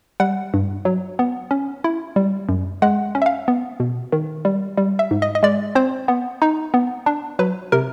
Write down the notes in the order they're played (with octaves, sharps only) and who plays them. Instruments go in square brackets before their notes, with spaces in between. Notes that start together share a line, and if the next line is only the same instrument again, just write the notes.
[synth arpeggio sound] G3 F#5
G2
F#3
B3
C#4
E4
G3
F#2
G#3 F#5
C#4
E5
F5
B3
B2
D#3
G3
G3
E5
G#2
D#5
D#5
G#3 D5
C4 C5
B3
D#4
B3
D4
F#3 B4
C3 A#4